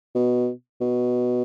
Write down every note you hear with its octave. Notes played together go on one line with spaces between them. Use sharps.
B2
B2